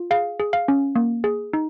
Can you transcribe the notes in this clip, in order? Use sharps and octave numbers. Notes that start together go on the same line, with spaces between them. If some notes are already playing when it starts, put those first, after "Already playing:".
Already playing: F4
G#4 F5
G#4
F5
C#4
A#3
G#4
D#4